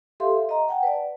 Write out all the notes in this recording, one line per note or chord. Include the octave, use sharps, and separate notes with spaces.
G4 A4 E5 F5 C6
D#5 A#5
F#5 G5 A5
B4 D5